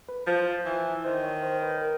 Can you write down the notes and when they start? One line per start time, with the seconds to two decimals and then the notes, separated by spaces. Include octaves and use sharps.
0.09 B4
0.27 F3 C5
0.66 E3
1.05 D#3 C5
1.24 C#5
1.43 C5
1.62 B4
1.82 A#4